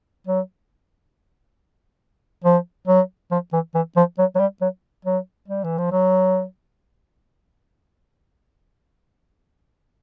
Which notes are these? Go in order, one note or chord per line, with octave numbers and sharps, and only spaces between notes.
F#3
F3
F#3
F3
E3
E3
F3
F#3
F#3
G3
F#3
F#3
G3
E3
F3
F#3